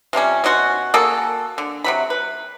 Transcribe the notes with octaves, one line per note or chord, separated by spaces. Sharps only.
C3 F3 G3 C#4
B2 C#4 F#4 C6
A#3 F#4 G#4 A4
D3
C3 F#3 B5
B4